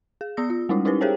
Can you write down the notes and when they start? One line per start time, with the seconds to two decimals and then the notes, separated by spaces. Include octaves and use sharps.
0.21 G#4
0.37 B3 D5 D#6 E6 A#6
0.50 F4
0.69 G3 G#3 C#4 D#4 E4
0.85 C#4 D#4 E4 G4 A#4 B4
1.01 G4 G#4 A#4 C5 C#5 G5